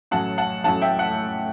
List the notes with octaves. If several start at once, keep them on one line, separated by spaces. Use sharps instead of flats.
A1 A2 F#3 C#4 F#5 A5
F#5 A5
A1 A2 F#3 C#4 F#5 A5
E5 G5
F#5